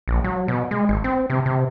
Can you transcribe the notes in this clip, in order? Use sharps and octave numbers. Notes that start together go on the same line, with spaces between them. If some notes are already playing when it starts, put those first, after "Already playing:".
A#1
F#3
B2
G#3
G#1
C4
C3
C3